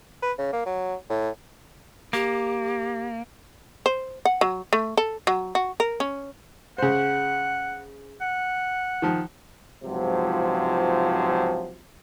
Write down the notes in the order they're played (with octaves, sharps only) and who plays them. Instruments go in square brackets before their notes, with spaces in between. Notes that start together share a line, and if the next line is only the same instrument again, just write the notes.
[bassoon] B4
C#3
A#3
F#3
A2
[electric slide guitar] A#3 [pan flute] G4
[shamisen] C5
F#5
F#3
A3
A4
F#3
F#4
A#4
C#4
[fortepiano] C#3 C5 [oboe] F#5
[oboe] F#5
[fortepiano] D#3 F3
[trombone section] C#2 G#2 C3 F3 F#3